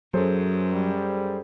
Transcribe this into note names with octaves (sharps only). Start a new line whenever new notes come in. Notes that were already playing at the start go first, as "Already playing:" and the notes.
F#2 F#3 G#4 A4 C5
G3